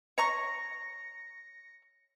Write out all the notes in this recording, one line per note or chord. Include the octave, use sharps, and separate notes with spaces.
C#5 A#5 C#6 A#6 C#7